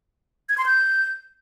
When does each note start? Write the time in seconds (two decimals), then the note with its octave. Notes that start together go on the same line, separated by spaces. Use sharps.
0.49 G#6
0.58 C6
0.66 G6